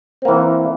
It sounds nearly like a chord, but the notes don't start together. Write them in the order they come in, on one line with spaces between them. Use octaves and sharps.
C4 A#3 E3